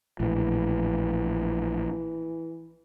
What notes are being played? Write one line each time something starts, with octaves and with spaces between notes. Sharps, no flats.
A#1 A2 E3